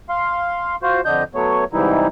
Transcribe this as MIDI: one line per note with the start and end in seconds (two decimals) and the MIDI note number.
0.09 0.76 77
0.09 0.76 84
0.82 1.01 65
0.82 1.01 66
0.82 1.01 72
1.05 1.23 41
1.05 1.23 50
1.05 1.23 62
1.05 1.23 75
1.05 1.23 91
1.35 1.64 54
1.35 1.64 57
1.35 1.64 59
1.35 1.64 73
1.73 2.07 44
1.73 2.07 48
1.73 2.07 52
1.73 2.07 55
1.73 2.07 63
1.73 2.07 64